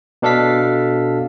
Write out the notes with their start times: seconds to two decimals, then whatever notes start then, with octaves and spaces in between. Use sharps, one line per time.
0.22 B2 D4 A4 F5 B6